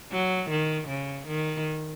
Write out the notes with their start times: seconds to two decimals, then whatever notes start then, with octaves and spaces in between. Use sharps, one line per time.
0.12 F#3
0.50 D#3
0.89 C#3
1.28 D#3